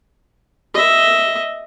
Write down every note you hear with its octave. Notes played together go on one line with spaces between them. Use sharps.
D#5 E5